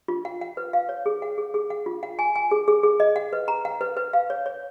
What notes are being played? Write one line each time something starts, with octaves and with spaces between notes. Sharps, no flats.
F4
F#5
F#5
B4
F5
C#5
G#4
F#5
G#4
G#4
F#5
F4
F#5
G#5
G#5
G#4
G#4
G#4
D#5
F#5
B4
A#5
F#5
B4
B4
F5
C#5
C#5